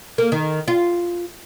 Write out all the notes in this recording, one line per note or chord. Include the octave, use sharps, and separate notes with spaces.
A#3
D#3
F4